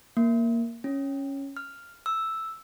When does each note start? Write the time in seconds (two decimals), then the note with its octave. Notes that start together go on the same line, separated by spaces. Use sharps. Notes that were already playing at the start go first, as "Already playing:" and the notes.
0.17 A#3
0.84 C#4
1.57 F6
2.06 E6